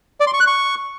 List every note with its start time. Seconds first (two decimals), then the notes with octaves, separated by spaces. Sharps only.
0.20 D5
0.27 C6
0.34 C#6
0.40 F#6
0.47 C#6